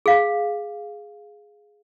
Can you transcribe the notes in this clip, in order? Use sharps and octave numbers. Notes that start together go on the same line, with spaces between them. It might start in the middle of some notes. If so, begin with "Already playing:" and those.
G#4 F5